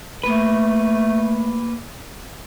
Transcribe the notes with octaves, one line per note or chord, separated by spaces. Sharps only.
A3 A#3 B4